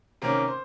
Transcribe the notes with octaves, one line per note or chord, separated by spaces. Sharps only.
C3 D#3 A#3 C#4 A#4
C5